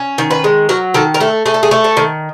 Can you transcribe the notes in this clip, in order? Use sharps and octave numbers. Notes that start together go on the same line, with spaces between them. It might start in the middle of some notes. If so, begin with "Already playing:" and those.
Already playing: C#4
D#3
B4
G#3
F#3 A#4
D#3 A4
A#4
A3 A4
A3 G#4
A4
G#4
A3
A4
D#3